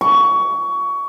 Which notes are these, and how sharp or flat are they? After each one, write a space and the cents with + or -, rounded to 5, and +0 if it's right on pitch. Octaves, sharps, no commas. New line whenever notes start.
C#6 +20